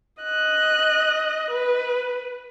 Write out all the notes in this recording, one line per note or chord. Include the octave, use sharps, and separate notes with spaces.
D#5 F#6
B4